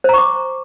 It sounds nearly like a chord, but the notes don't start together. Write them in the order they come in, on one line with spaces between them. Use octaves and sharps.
C5 A#5 C#6 D6